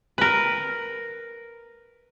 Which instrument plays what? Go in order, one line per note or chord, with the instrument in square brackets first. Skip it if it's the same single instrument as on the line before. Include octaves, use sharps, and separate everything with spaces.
[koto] A#4 B4